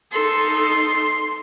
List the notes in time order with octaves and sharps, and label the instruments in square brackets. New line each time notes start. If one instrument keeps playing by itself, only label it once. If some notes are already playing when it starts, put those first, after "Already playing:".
[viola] D#4 A4 [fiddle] C6